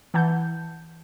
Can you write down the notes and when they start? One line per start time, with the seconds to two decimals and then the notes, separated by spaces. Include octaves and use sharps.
0.14 E3 F#5 A5 G6